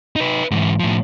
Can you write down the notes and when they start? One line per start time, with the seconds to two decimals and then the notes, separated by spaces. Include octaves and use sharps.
0.16 D#4 B4
0.51 G#2 E3
0.80 A2 F3